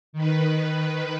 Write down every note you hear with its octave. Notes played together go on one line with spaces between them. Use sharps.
D#3 B4